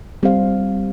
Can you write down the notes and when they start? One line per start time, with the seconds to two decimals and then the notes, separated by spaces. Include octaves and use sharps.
0.23 G3 C4 G4 C5 F5